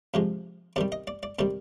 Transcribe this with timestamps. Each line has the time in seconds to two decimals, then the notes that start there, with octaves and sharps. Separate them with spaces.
0.14 C3 F3 G#3
0.76 C3 D#3 G3 D5
0.92 D#5
1.07 D5
1.23 D5
1.39 C3 D#3 G3 D5